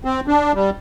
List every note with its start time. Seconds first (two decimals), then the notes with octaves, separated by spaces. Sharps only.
0.05 C4
0.27 D4
0.55 G3